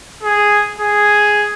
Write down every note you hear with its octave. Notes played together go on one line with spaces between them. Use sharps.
G#4
G#4